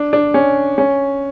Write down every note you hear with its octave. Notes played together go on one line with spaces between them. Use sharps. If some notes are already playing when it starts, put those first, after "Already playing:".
Already playing: D4
D4
C#4
C#4